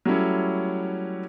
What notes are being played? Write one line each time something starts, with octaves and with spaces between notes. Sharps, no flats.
F#3 G3 A3 C#4 E4